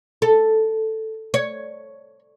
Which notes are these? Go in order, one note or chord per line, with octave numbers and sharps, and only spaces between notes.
A4
C#5